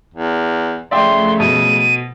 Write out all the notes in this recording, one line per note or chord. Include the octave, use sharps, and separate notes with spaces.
E2
C#3 F3 A3 D5 E5 G5 C6
B2 D#7